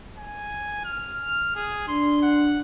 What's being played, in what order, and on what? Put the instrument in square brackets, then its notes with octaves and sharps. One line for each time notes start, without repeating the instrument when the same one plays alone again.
[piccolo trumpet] G#5
F6
G#4
[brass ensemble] D4 [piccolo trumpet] C6
[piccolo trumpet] F#5